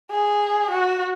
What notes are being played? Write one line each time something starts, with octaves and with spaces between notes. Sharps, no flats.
G#4
F#4